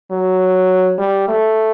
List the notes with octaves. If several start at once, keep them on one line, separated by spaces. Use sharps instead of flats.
F#3
G3
A3